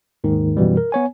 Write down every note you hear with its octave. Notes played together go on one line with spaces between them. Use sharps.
D#2 G#2 D#3
F#2 B2 E3 G3
A#4
B3 C#5 G#5